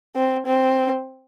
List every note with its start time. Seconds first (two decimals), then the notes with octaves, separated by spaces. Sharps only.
0.16 C4
0.46 C4